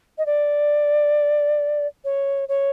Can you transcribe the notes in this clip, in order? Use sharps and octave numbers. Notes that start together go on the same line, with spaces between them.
D#5
D5
C#5
C#5